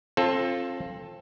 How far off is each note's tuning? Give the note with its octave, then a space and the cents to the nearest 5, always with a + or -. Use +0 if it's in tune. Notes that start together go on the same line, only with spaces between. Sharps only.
C4 +30 F4 +0 A4 +0